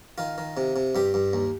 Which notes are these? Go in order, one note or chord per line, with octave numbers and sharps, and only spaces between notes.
D#3 F4
D#3
C3
C3
G2 G4
G2
D#2